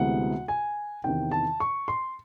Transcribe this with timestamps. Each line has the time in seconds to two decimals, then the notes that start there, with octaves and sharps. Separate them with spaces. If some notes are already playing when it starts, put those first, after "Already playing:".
Already playing: D2 C3 E3 G#3 B3 F#5
0.48 G#5
1.04 E2 C3 D#3 G5
1.31 A5
1.60 C#6
1.88 C6